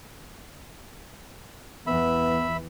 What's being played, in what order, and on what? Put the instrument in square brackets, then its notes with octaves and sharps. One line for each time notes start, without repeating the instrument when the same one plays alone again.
[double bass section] E2 E3 [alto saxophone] B3 [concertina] E5 B5